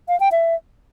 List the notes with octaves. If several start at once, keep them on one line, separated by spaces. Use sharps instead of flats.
F5
G5
E5